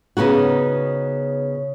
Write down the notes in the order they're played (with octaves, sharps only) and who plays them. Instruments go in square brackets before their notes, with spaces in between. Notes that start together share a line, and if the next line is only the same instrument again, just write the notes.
[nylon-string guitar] C#3 B3 D#4 F#4